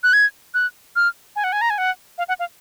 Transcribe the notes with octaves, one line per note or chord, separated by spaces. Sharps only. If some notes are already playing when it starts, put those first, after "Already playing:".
F#6
G#6
F#6
F6
G#5
F#5
G#5
A#5
G#5
F#5
F5
F#5
F5